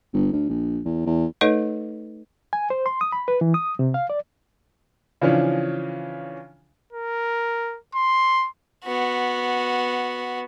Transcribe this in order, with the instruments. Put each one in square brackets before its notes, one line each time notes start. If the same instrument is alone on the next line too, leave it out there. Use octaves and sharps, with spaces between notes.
[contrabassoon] G1
D2
A#1
E2
E2
[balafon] A3 D#4 A4 B4 C#5 D#5
[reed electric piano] G#5
C5
C6
D#6
B5
B4
E3
D#6
C3
F5
D5
[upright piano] C#3 E3 F3 C#4 D4
[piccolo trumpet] A#4
C6
[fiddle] B3 F#4